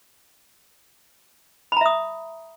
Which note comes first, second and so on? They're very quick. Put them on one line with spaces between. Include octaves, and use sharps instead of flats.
B5 A#5 E5 D#6